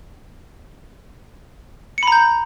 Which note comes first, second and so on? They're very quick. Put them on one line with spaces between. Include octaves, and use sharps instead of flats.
C#7 B5 A#5 G6